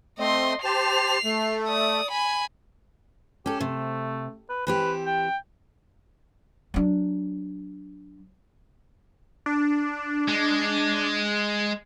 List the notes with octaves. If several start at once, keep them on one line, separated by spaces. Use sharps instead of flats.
A3 C4 D#5 C6
G4 C5 A5 C7 F7
A3
D5 D#6
G#5 B5
C#4 G4 A4
C3 A3
B4
E3 C4 G4 B4
G5
F#3 D4
D4
G#3